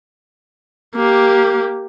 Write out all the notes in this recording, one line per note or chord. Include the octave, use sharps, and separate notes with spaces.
A#3 G4